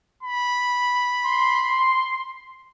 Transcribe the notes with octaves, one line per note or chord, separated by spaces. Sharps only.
B5
C6